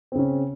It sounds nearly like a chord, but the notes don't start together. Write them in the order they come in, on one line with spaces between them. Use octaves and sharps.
C4 C#3 C#4